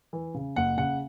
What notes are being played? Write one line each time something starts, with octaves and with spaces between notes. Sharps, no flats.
E3
C#3
F#1 F#5
C#3 F#5